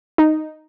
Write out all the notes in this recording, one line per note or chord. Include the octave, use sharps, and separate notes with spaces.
D#4